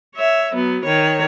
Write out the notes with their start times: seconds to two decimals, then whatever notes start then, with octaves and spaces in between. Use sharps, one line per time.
0.15 C#5 E5
0.54 F#3 B3
0.85 D#3 C#5